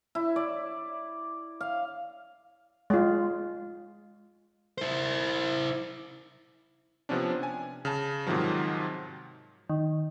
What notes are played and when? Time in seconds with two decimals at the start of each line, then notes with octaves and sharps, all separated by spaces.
0.15 E4
0.36 D5
1.61 F5
2.90 G#3 F4
4.78 E4 C5
7.09 C3 F3 B3 C#4 D4
7.43 G#5
7.85 C#3 A5
8.27 G#2 C3 D#3 F3 F#3
9.70 D#3